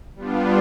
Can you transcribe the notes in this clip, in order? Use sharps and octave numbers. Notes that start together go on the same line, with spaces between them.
G3 B3 D4 F4